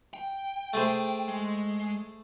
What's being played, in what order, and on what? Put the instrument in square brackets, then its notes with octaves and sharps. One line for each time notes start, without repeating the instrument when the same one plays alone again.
[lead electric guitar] G5
[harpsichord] A3 G#4 C5
[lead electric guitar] G#3